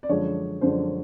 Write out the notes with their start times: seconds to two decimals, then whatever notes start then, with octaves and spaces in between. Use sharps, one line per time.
0.03 D5
0.09 F#2 D3 F3 G#3 C#5
0.61 F#2 D3 F3 G#3 C5